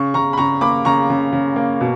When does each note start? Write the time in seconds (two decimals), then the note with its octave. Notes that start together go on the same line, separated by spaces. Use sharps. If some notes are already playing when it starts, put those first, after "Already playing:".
Already playing: C#3 C#6
0.14 C#3 A#5 C#6
0.33 B5
0.38 C#3 A#5 C#6
0.61 A#3 B5 D6
0.85 C#3 A#5 C#6
1.10 C#3
1.33 C#3
1.56 A#3
1.81 B2